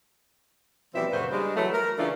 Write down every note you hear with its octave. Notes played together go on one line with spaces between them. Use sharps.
B2 E3 F3 G3 C4 E5
F#2 A#2 C#3 F#4 B4 C5
G3 G#3 D4
E3 F#3 A3
A#4
C#3 E3 A3 C#4 D4 F4